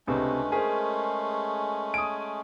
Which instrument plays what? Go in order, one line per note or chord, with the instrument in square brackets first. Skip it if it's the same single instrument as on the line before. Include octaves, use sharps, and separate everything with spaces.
[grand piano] C#2 C3 [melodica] G#3 A3 C#4 [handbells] D4 B4
[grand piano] G#4 [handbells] A#4 C5
[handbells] G#5 [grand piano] D#6 D7